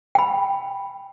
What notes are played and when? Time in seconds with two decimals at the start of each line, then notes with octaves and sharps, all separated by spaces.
0.15 G5 B5